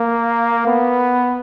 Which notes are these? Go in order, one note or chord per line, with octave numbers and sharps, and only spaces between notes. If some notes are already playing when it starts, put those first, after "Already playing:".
Already playing: A#3
B3